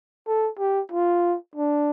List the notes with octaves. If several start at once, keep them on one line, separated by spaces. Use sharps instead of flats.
A4
G4
F4
D4